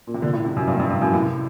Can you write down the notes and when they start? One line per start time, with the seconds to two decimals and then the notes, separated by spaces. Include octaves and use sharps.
0.07 A#2
0.14 C3
0.22 A#2 D3
0.33 A2 C3
0.45 A2 C3
0.56 F#2
0.67 G2
0.74 A2
0.79 G2
0.90 G2
1.02 F#2 A2
1.13 A2 C3